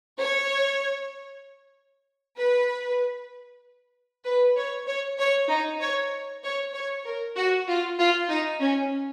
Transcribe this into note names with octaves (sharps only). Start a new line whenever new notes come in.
C#5
B4
B4
C#5
C#5
C#5
D#4
C#5
C#5
C#5
A#4
F#4
F4
F4
D#4
C#4